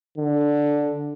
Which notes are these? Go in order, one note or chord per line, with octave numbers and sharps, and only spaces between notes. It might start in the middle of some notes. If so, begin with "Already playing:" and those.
D3